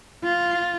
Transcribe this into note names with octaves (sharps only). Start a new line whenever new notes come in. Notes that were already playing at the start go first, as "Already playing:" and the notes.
F4